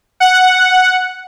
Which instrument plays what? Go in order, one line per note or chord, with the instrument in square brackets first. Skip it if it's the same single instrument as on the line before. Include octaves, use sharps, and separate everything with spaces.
[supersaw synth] F#5